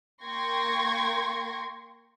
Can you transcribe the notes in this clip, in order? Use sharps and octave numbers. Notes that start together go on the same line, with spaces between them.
A#3 G5 C6 C#6 G#6 A#6